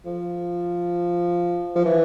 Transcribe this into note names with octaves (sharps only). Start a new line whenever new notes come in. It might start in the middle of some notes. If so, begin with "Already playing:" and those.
F3
F3
E3